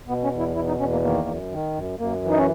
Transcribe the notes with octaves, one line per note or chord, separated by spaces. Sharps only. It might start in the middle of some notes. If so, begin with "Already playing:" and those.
B2 B3
C#4
E2
E4
B2 E4
D#4
E2 C#4
A#3
D#3 A#3
F#2
D#3
F#2
F#2 A#3
E3
D#4
C#4